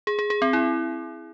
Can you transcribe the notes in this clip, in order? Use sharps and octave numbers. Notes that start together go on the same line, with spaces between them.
G#4
G#4
G#4
C4
E4